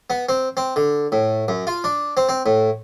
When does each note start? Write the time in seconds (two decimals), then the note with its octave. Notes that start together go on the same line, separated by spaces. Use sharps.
0.10 B3
0.29 C4
0.57 C4
0.76 D3
1.12 A2
1.48 F#2
1.67 F4
1.84 D4
2.17 C4
2.29 C4
2.46 A2